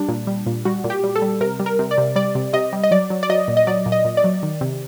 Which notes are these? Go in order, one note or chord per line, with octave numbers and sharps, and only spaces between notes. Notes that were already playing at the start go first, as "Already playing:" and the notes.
Already playing: G3 D4
A#2
G3
A#2
G3 F#4
A#2
G4
G3
A4
G3
C3 A#4
G3
A#4
C3
D5
C3
G3 D5
C3
C3 D#5
G3
D#5
F#3 D5
F#3
D5
F#3 D#5
A#2
D#5
F#3 D5
A#2
D#5
A#2
D5
F#3
D#3
C3